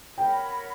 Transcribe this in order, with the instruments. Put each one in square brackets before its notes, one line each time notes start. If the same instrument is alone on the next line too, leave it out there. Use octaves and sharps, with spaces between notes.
[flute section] A#4 C#5 F#5 B5 [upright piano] G5